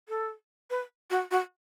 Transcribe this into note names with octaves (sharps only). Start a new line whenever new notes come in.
A4
B4
F#4
F#4